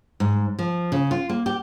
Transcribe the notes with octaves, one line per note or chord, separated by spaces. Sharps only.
G#2
F3
C#3
F4
A#3
G4